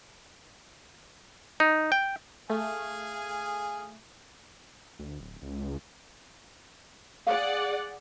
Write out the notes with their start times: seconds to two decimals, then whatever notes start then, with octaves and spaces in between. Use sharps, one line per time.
1.60 D#4
1.92 G5
2.50 A3 G#4 F5 G#5
4.99 D2
5.20 D1
5.42 C#2
7.27 G#4 D5 F5 F#5